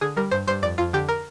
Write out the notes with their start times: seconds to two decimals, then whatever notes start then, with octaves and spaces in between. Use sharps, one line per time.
0.01 D3 G#4
0.16 G3 A#4
0.31 G2 C5
0.47 G2 C5
0.62 F2 D5
0.78 F2 F4
0.93 D3 G4
1.09 A#4